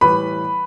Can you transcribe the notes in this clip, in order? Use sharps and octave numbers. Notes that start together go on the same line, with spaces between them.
A2 E3 G3 B4 B5